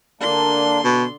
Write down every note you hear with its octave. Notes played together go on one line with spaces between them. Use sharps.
D3 A#3 D4 C6
B2